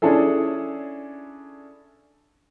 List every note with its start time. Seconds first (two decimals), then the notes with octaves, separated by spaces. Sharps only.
0.02 C#4 D4 E4 G#4 A4